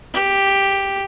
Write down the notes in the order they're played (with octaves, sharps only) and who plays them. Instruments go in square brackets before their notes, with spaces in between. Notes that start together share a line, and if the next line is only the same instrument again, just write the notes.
[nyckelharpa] G4